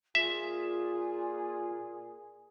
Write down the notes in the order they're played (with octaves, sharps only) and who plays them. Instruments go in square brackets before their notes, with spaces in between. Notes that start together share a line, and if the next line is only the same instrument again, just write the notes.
[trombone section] A#2 G#4 [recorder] F4 [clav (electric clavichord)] E5